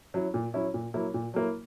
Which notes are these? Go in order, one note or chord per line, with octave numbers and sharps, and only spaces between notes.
F#3 C#4 E4
A#2
F#3 C#4 E4
A#2
F#3 A#3 E4
A#2
F#3 A#3 E4